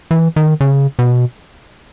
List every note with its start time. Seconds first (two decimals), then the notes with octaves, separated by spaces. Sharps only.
0.11 E3
0.36 D#3
0.61 C#3
0.99 B2